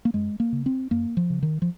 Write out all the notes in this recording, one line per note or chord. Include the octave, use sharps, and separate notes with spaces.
A#3
F#2 G#3
A#3
C#3
C4
F#2 A#3
F3
C#3
D#3
F3